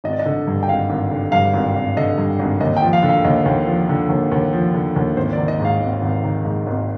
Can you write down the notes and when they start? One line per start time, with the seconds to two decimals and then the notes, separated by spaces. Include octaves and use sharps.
0.04 G#1 D#5
0.13 D5
0.19 D#5
0.26 D3
0.47 G2
0.63 G5
0.68 G#1 F5
0.89 G#1
1.11 D3
1.32 G2 F5
1.53 G#1
1.76 G#1
1.97 D3 D#5
2.18 G2
2.39 G#1
2.61 D#2 D#5
2.77 G5
2.82 F3
2.93 F5
3.03 D3
3.09 F5
3.24 D#2 D#5
3.45 D#2
3.67 F3
3.89 D3
4.09 D#2
4.31 D#2
4.53 F3
4.75 D3
4.96 D#2
5.17 G#1 C5
5.33 D#3 D5
5.48 D#5
5.60 G#2 F5
5.80 G#1
6.02 G#1
6.24 D#3
6.45 G#2
6.67 G#1